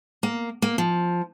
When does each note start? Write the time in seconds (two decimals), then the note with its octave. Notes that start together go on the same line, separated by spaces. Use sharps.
0.23 A#3
0.62 A#3
0.78 F3